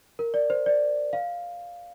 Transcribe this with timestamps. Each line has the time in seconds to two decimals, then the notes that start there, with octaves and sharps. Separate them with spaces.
0.19 A#4
0.34 D5
0.50 C5
0.66 D5
1.13 F5